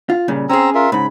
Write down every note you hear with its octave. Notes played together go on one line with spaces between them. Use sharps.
F4
A#2 C#3 G3
C4 C#4 G#4 A#5 E6
F4 A#4 E5
G#2 C#3 B5